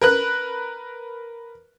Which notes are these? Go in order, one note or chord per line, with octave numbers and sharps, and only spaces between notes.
A#4 B4 F#6